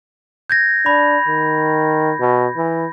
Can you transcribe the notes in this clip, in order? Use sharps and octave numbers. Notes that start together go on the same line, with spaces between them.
G6 G#6 A#6
D4 B5
D#3
B2
E3